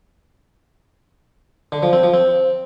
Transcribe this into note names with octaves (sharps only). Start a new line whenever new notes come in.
D3
F3
C4
F3
C4